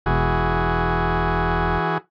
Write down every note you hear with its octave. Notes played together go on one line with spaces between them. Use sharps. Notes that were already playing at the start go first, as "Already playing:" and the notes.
E1 E3 F#4 G#4